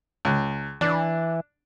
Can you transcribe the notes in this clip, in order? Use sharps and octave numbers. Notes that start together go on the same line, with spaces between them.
C#2
E3 D4